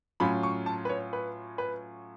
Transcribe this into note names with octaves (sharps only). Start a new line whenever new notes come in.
A2 F#3 C#4 F4 B5
C#6
A5
B4
C#5
B4
B4